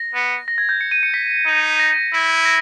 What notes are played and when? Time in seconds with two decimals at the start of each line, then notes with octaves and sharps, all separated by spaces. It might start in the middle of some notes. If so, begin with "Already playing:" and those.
Already playing: A#6
0.14 B3
0.48 A#6
0.58 G#6
0.69 G6
0.81 C#7
0.91 D#7
1.03 C#7
1.14 B6
1.46 D#4
1.80 A#6
2.13 E4
2.45 A#6